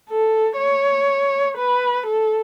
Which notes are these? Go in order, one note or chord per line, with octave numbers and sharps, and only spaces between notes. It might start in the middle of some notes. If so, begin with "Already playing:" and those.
A4
C#5
B4
A4